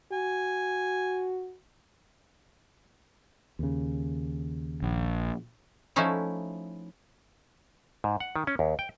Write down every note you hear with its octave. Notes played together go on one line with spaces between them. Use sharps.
F#4 G#5
D#2 C#3
A#1
F3 A3 C#4 D#4 E4
G#2
F#5
D#3
C#4
D#2
G5